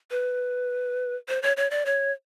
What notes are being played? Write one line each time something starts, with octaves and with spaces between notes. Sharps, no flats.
B4
C5
C#5
C#5
D5
C#5